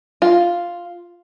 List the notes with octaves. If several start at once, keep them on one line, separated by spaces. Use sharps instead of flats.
F4